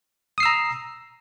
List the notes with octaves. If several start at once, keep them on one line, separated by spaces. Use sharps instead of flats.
A#5 D#6 E6 C7